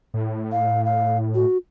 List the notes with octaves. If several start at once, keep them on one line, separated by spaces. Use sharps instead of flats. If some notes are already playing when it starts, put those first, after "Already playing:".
A2
F5
F5
F#4